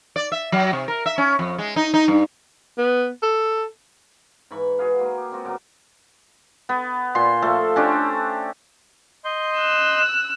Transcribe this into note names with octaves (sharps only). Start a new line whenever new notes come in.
D5
E5
F#3
C3
A#4
E5
C#4
F2
G#3
D#4
D#4
G2
B3
A4
G#2 E3 B5 C#6
F#4 G#4 B4 F5
G#3 A#3
G4
G#3 C4 F4 F#4
F#2 C#3 A#4 D6
B3
A#2 C6
F3 A3 A4
C#4 D4 G4 C5
D#5 C6 G6
E6 F#6